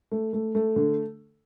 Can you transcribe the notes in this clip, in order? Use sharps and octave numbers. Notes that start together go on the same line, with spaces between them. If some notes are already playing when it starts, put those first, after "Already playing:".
A3
A3
A3
D3